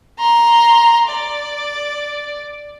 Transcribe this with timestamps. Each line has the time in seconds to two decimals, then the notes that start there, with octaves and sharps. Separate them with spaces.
0.20 A#5 C6
1.09 D5